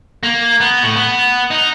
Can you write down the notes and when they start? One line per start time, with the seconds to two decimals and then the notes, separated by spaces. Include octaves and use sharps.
0.23 A#3
0.60 B3
0.83 A2
0.96 B3
1.51 D#4